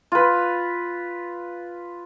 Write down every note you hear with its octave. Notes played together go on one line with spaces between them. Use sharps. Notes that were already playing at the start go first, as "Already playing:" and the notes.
F4 B4